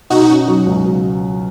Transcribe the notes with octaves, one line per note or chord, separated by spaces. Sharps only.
B2 D#4 F#4
C#4
F#3
C#2
B2